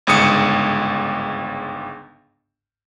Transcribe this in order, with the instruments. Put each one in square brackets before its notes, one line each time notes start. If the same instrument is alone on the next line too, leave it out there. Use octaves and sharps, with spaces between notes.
[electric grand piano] G1 C#2 G#2 D#6 C#7